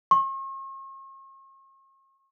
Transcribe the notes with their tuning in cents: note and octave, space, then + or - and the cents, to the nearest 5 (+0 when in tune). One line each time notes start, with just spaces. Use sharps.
C#6 -45